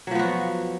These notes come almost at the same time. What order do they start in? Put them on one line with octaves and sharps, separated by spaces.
F#3 F3 B3 F#4